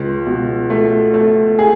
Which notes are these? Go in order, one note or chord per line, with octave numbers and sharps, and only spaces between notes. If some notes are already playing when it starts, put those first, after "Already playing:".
Already playing: C#2
B2
A3
A3
G#4